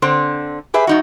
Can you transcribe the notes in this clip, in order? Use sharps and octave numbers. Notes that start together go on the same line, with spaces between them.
D3 C4 C5
G4 G#4 B4 E5
F#2 D#4 F#4